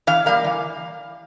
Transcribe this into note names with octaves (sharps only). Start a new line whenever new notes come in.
E3 F5
G3 A#3 F5
E3